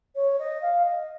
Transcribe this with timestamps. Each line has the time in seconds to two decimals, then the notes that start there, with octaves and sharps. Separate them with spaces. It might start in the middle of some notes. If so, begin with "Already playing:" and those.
0.15 C#5
0.39 D#5
0.62 F5
0.85 D#5